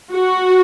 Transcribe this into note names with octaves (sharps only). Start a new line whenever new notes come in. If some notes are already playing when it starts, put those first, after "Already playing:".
F#4